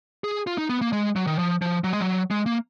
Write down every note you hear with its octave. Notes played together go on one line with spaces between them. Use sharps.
G#4
F4
D#4
B3
A#3
G#3
F#3
D#3
F3
F3
F#3
G#3
F#3
G#3
A#3